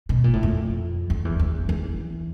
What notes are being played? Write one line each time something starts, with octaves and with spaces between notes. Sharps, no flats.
B2
A#2
A2
F2
F2
E2
E2
E2